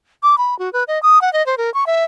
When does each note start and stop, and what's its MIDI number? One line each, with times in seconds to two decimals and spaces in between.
0.23 0.38 86
0.38 0.57 83
0.59 0.71 66
0.73 0.84 71
0.88 1.01 75
1.03 1.21 87
1.21 1.32 78
1.33 1.45 75
1.46 1.57 72
1.57 1.72 70
1.74 1.84 85
1.86 2.04 76